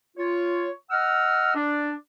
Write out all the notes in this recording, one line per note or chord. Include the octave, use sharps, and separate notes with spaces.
F4 C#5
D#5 F#5 E6 F6
D4